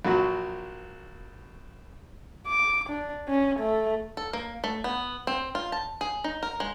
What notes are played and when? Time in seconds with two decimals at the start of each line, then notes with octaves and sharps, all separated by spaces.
0.05 A#1 F#3 F#4
2.47 D6
2.89 D4
3.28 C#4
3.59 A3
4.17 A4
4.33 A#3
4.64 A3
4.84 B3
5.27 C4
5.55 F4
5.72 A5
6.01 G#4
6.24 D#4
6.43 A#4
6.60 G#3